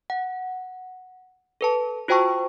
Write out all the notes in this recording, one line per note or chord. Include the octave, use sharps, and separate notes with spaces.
F#5
A4 B4 A5
F4 F#4 C5 G5 A5 C#6